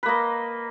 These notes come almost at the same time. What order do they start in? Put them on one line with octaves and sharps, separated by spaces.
B4 A#3 D#5